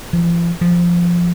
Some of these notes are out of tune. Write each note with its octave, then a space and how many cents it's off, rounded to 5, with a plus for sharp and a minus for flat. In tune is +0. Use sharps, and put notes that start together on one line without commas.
F3 -40
F3 -5